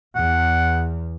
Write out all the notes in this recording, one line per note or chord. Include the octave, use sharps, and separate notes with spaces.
E2 F#5